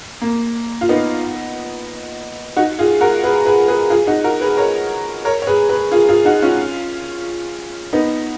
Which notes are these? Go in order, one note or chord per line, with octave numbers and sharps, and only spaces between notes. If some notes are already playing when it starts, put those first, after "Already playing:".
A#3
F4
B3 D#4
D#4 F#4
F4 G#4
F#4 A#4
G#4 B4
G#4 B4
G#4 B4
F4 G#4
D#4 F#4
F#4 A#4
G#4 B4
A#4 C#5
A#4 C#5
C#5
G#4 B4
G#4 B4
F4 G#4
F4 G#4
D#4 F#4
C#4 F4
B3 D#4